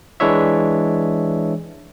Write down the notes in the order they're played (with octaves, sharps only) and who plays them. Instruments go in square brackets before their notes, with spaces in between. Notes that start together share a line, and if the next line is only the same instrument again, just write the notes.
[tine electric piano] E3 G#3 D4 E4 C#5 E5